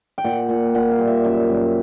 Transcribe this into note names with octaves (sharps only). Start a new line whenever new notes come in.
G5
A#2 F#5
A#2
A#2 F#5
F5
G3
E5
F#2 E5
F#2